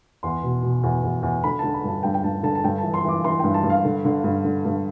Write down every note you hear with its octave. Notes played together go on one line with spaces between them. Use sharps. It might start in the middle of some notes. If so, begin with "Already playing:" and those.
E2 C6
B2
B2
E2
E2
E2
D3 B5
A5
D3
B5
G2 A5
G2 G5
G5
G2 A5
D3 A5
A5
G2 G5
A5
E3
C6
E3 D6
E3 C6
G5
G2
A5
G2
F5
D3
D3
G2
D3
G2